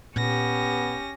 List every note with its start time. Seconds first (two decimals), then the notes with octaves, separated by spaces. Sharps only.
0.16 A#2 B3 C#4 G4 A#6